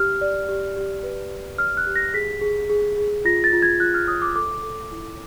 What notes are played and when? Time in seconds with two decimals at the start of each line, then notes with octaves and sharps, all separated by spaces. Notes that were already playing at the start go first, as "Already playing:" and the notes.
Already playing: G4 F6
0.21 D5
0.49 G4
0.77 G4
1.03 B4
1.32 G4
1.58 D5 F6
1.77 F#6
1.87 G4
1.96 A#6
2.14 G#4 B6
2.41 G#4
2.70 G#4
2.98 G#4
3.25 F4 A#6
3.44 A6
3.53 F4
3.62 G#6
3.80 F4 F#6
3.94 F6
4.08 C#5 D#6
4.22 D6
4.35 A4 D6
4.63 A4
4.91 E4